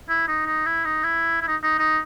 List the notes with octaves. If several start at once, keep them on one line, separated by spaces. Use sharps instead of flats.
E4
D#4
D#4
E4
D#4
E4
E4
D#4
D#4
D#4